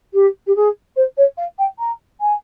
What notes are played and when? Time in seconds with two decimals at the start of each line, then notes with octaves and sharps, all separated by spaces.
0.14 G4
0.47 G4
0.56 G#4
0.96 C5
1.17 C#5
1.37 F5
1.59 G5
1.79 A#5
2.21 G#5